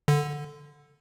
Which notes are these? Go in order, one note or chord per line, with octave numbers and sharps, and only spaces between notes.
D3